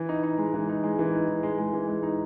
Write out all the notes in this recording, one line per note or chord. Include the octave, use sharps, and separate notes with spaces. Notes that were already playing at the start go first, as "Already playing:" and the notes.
Already playing: E3
D#4
D#4
G#3
E3
D#4
G#3
E3
D#4
E3
G#3
G#3
E3
G#3
D#4